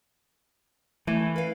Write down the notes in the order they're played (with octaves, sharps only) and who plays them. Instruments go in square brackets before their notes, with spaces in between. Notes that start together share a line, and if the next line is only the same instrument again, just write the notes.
[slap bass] E3 [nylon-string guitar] A3
[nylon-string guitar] B4 F5